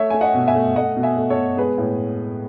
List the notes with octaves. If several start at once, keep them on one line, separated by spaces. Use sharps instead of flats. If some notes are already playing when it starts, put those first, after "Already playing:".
Already playing: A3 C#5 E5
A3 G#5
D#5 F#5
B2
E5 G#5
A3
A3 D#5 F#5
B2
E5 G#5
A3
A4 C#5
B2
G#3 G#4 B4
A2